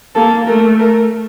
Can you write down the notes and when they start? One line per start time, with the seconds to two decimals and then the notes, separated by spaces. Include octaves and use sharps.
0.15 A#3 A4
0.47 A3 A#4
0.79 A#4